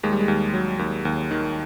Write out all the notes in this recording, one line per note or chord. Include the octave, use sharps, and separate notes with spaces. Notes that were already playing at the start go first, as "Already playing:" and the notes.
D#2 G#3
G3
G#3
D#2
F#3
D#2
D#2
D#3